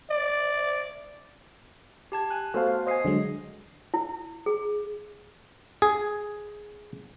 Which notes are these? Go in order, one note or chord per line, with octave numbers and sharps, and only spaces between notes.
D5
G4 A5 G#6
G#5 F#6
A3 B3 F#4 A4 C5 F5
C5 D#5 G#5 D#6 C7
D3 F#3 G#3
E4
G#4
G#4